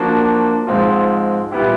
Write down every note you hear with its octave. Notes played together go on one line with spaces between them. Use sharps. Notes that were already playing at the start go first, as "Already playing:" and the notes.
Already playing: F3 A#3 D4 F#4
G#2 F3 G#3 C4 F4
A#2 G3 B3 E4 G4